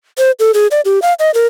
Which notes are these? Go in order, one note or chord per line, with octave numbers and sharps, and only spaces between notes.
C5
A4
G#4
D5
G4
F5
D#5
A#4